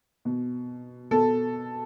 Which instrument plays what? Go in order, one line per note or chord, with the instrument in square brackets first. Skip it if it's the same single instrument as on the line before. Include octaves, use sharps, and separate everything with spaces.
[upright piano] B2
B2 A4